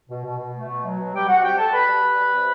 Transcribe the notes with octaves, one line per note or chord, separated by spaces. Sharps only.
B2
B2
B2
A3
B2
F#3
B2
G3 G4 G5
G3 F#4 F#5
C3 G4 G5
G3 A4 A5
G3 B4 B5
G3
G3
G3
C3